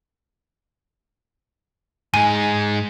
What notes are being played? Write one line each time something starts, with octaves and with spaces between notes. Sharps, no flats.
G#2 G#3 G#5